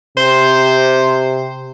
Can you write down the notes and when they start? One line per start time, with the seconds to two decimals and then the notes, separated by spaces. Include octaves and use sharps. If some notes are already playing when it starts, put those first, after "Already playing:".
0.17 C3 C5